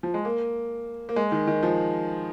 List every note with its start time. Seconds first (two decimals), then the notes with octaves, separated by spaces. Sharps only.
0.03 F3
0.14 G#3
0.25 A#3
1.09 A#3
1.16 G#3
1.32 D#3
1.47 D#3
1.63 F3